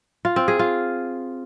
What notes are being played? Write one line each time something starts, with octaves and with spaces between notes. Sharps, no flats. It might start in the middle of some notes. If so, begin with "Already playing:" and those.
F4
C4
G#4
F4